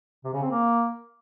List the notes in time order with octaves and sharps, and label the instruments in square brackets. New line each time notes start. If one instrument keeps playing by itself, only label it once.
[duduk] C3
C#3
C4
A#3